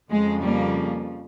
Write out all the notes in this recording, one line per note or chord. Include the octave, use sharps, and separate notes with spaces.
F2 C#3 F3 G#3
G3 A#3